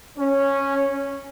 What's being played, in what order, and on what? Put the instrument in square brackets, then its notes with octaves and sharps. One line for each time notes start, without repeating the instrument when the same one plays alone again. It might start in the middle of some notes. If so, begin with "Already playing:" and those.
[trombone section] C#4